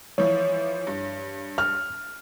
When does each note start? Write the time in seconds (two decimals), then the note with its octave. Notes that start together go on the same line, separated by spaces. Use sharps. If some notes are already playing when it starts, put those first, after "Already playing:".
0.18 E3 F3 E4 C#5
0.87 G2
1.58 F6